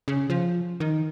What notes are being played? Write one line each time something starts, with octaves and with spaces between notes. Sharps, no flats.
C#3
F3
D#3